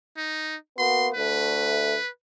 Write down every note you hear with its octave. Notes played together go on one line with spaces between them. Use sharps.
D#4
A#3 B3 F#4 C6
D2 A3 B4